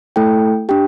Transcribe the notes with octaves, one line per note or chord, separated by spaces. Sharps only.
A3 E4 A4 G5
D4 G4 G5